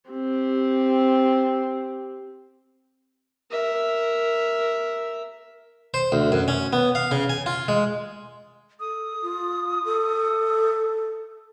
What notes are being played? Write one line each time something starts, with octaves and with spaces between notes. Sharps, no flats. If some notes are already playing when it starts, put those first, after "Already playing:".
C4 G4
A#4 E5
C5
D2
F#2
C#4
B3
F5
C#3
G#5
F4
G#3
A4 D#6
F4
A4